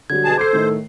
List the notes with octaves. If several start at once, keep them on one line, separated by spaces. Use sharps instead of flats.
D3 F#3 G3 G#6
B2 G#4 A5
A4 C5 D6 C7
A2 D#3 A3